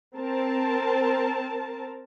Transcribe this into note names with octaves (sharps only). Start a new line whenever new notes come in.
C4 A#4 A5